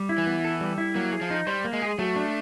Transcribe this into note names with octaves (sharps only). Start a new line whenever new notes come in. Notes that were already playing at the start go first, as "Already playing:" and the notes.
Already playing: G3
E4
E3
B3
A4
G3
E4
F#3 A#3
G#4
F3
D#4
G3 C5
A#3
G#3
G#4
F#3 A3
D4